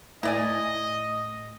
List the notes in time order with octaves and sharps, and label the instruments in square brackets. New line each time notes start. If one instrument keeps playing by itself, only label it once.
[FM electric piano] A2 A#6 [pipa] E4 D5 G#5 [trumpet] D#5